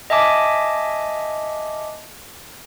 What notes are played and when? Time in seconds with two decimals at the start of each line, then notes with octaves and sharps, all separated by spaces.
0.10 D#5 E5 G#5 A5 D6